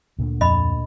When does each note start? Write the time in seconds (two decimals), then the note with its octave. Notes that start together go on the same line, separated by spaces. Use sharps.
0.19 D2 A#2 D3
0.41 F2 D#5 B5